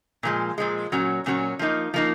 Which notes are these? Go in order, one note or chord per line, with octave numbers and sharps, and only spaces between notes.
A#2 F3 G#3
A#2 F3 G#3
A#2 F#3 C#4 F#4
A#2 F#3 C#4 F#4
F3 A#3 D#4
F3 A#3 D#4